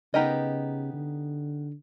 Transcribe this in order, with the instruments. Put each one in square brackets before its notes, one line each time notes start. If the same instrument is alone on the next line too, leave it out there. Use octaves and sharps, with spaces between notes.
[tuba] C#3 [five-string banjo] B3 D#4 G4 A#4 D#5
[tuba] D3